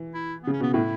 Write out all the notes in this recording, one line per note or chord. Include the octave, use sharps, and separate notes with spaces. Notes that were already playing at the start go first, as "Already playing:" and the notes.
Already playing: E3
E4
C#3 B3
C#4
B2 B3
A2 E4